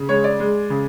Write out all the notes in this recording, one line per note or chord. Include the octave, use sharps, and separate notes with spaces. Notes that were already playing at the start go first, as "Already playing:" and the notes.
Already playing: C#3
G#3 C#5
D5
G#3
C#3